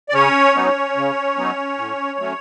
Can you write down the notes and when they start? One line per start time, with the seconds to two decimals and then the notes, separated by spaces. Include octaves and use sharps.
0.09 D5
0.14 C#3 C#4 C#5
0.55 F#3 B3 D#4
0.97 C#3
1.37 F#3 B3 D#4
1.78 A2
2.19 F#3 A3 C#4